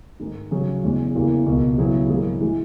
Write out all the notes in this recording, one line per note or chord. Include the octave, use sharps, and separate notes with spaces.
G#2 D#3 G#3 D#4
C#3 F#3 C#4 G#4
E2 C#3 G#3 C#4
E2 C#3 E3 A#3
C#2 B2 A#3
C#3 F#3 B3 E4 G#4
G#2 F#3 A#3 E4 G#4
E3 G#3